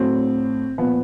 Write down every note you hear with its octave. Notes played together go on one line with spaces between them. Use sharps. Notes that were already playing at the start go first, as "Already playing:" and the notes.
Already playing: A2 F#3 C4
A#2 F3 B3